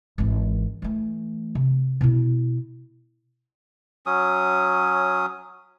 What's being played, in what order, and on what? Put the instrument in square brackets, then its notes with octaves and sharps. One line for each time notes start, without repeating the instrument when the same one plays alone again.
[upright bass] G#1 E3
E3 A3
C3
B2 E4
[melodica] F#3 C#4 D#6